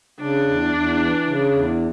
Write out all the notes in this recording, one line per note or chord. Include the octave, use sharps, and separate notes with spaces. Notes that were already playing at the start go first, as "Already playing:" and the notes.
C#3 D4
E2
E2
E3
C#3
E2